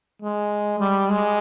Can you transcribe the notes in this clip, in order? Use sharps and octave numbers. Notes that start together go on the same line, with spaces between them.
G#3
G3
G#3